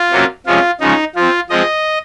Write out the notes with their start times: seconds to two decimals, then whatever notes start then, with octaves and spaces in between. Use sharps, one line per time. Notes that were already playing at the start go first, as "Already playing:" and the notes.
Already playing: F4
0.11 C3 F#3 A#3 C#4
0.46 C3 F3 G#3 C#4 F4
0.80 C#3 F3 G#3 C#4 D#4
1.15 F3 C4 F4
1.50 F3 G#3 C4 D#5